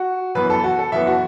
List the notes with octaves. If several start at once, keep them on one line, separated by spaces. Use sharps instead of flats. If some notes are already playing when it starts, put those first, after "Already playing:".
Already playing: F#4
F#2 E3 B3 B4
A4
F#4
A4
F#2 E3 B3 E5
F#4